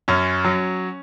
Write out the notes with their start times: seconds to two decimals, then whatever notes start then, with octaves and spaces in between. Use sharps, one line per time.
0.08 F#2 C#4
0.45 F#3